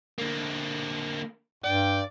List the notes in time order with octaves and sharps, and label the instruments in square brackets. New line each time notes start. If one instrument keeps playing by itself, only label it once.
[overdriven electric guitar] D3 A#3
[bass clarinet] G2 [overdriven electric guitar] D5 [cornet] G5